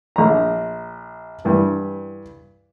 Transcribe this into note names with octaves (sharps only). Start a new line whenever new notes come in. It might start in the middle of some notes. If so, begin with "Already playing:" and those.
A#1 A#5
G2 E3